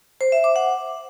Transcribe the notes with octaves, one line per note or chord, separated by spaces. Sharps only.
C5
E5
D6
F#5